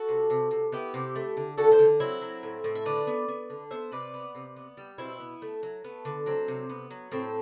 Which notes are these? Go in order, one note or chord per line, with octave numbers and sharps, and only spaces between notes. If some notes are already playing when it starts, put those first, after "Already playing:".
Already playing: F#4 A4
C3
C3
C3
B3 E4 G4
C3
A3
D3
D3 F#4 A4
A4 C5
D3
F#3 C4 E4
F#3
A2
A2
E5
D3 B4 D5
B3
B3
D3
B3 C5 E5
C3 B4 D5
B3
C3
B3
G3
B2 C4 E4
B3
A3
F#3
A3 B3
D3
F#3 C4
C3
B3
F#3
A2 C4